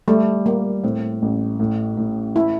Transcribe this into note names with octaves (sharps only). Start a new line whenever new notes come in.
G3 A3
G3 A#3
A2 C4
A1
A2
A2
A3 E4